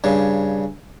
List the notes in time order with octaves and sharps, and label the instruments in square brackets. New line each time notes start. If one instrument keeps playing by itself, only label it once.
[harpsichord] G2 C#3